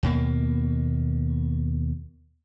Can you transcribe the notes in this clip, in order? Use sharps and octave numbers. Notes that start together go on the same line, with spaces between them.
D#2 B2 A#3